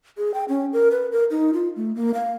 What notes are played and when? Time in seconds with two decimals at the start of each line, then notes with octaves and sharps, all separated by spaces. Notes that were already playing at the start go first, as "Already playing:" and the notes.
0.18 G#4
0.34 G5
0.49 C#4
0.73 A#4
0.91 B4
1.12 A#4
1.31 D#4
1.54 F4
1.76 A3
1.95 A#3
2.14 F5